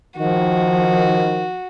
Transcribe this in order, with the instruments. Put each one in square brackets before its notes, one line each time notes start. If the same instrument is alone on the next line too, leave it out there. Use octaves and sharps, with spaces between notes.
[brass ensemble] D#3 [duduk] F3 [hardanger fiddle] F#4